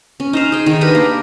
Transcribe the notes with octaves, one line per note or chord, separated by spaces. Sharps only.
C#4
D#4 C5 F5
G#4 G5
D#3
D4 G4 A#4 B4
A#3